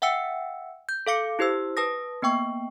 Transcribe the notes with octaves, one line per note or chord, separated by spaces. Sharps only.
E5 F#5 G5 E6 C#7
G6
A4 F5 D6 C#7
E4 G4 C5 E6
B4 A5 D#6 A#6
A#3 B3 G5 C#6